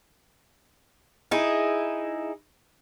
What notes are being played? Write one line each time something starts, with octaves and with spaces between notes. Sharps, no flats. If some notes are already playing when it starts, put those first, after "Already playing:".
D#4 E4 G#4